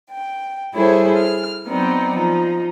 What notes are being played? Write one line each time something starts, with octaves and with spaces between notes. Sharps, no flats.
G5
G3 E4 G#4 A4 C5 C#5
F6
F#3 B3 C4 D#4 D5
F3 D#4